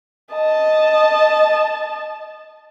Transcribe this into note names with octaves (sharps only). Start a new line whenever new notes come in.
D#5 A5